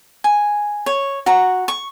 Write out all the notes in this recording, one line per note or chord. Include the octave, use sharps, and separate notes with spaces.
G#5
C#5
F#4 A#5
C#6